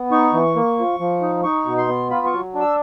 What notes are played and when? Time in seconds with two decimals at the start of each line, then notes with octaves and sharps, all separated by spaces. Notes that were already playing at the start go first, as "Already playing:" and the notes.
Already playing: B3
0.11 D#4 C#6
0.33 E3
0.56 A#3
0.79 F3
1.00 F3
1.22 D#4
1.44 D#4 C#6
1.66 B2
1.78 C6
1.89 B3
2.11 F4 B5
2.26 C#6
2.33 F#3
2.54 D4
2.61 E6